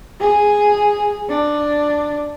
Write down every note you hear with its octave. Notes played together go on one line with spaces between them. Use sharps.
G#4
D4